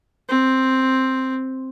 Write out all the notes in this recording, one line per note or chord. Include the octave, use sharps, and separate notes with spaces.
C4